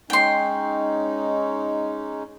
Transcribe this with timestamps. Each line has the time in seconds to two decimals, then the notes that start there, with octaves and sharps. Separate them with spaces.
0.10 G#3 C#4 D#4 G5 C6